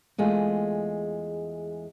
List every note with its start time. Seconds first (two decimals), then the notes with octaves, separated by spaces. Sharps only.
0.18 E2 G#3 A3 F4